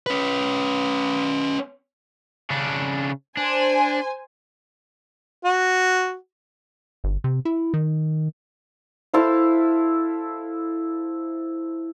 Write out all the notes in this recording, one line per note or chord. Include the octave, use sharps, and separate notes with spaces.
C#4 B4
C#3 D4
D4 C5 G#5
F#4
G1
C3
E4
D#3
E4 A4 C5 F5